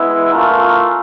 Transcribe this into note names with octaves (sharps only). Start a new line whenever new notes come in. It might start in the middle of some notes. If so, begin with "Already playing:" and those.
Already playing: G#3 B3 E4
A3 C#4 F4 A#4